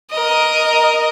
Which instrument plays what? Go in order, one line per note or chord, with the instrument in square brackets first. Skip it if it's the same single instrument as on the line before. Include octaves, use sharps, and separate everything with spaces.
[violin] A#4 D#5